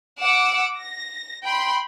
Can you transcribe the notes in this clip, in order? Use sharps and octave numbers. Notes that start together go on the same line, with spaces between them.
F#5 D6 E6
A#6
G5 B5 C6